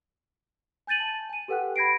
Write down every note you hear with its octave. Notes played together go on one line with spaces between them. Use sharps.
G#5 G6 A6 D#7 F#7
A5
G#5 D#7
G4 A4 B4 F#5 G5 F#6
B5 G#6 A#6 C7 D7